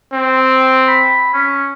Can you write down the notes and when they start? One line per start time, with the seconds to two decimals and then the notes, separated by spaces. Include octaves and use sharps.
0.13 C4
0.88 B5
1.34 C#4